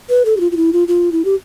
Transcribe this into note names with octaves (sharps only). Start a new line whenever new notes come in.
B4
A4
G4
F4
F4
E4
F4
F4
E4
G4